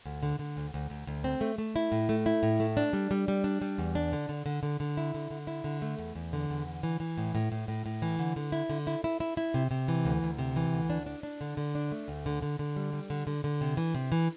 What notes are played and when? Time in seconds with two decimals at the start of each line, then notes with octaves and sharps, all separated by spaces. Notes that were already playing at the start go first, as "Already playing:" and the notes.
0.05 D2
0.23 D3
0.39 D3
0.57 D2
0.74 D2
0.90 D2
1.07 D2
1.24 C4
1.41 A3
1.58 A3
1.76 E4
1.92 A2
2.09 A3
2.26 E4
2.43 A2
2.60 A3
2.77 D4
2.93 G3
3.11 G3
3.28 G3
3.44 D4
3.62 G3
3.78 E2
3.95 D4
4.13 D3
4.29 D3
4.46 D3
4.63 D3
4.80 D3
4.97 E4
5.15 D3
5.31 D3
5.47 E4
5.64 D3
5.82 A3
5.98 E2
6.15 E2
6.33 D3
6.50 E2
6.66 D3
6.83 E3
7.00 E3
7.18 A2
7.35 A2
7.52 A2
7.68 A2
7.86 A2
8.02 E3
8.19 D3
8.36 D3
8.52 E4
8.70 D3
8.87 E4
9.04 E4
9.20 E4
9.37 E4
9.54 C3
9.71 C3
9.88 E3
10.05 D2
10.23 D2
10.38 C3
10.56 E3
10.73 D2
10.90 D4
11.06 D4
11.23 D4
11.41 D3
11.57 D3
11.75 D4
11.92 A3
12.08 D2
12.26 D3
12.42 D3
12.59 D3
12.76 G3
12.93 G3
13.10 D3
13.27 D3
13.44 D3
13.61 C3
13.77 E3
13.94 C3
14.12 E3